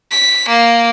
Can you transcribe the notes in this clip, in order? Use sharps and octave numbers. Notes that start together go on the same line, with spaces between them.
B6
A#3